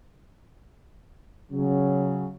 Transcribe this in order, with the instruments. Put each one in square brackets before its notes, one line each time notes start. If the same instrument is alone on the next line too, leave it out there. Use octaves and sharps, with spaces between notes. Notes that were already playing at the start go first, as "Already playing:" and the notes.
[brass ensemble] C#3 F#3